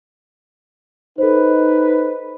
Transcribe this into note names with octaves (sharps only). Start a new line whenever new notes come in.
D#4 A4 B4 C5